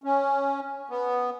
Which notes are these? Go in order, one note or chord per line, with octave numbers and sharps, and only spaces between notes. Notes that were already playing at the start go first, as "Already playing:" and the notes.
C#4
B3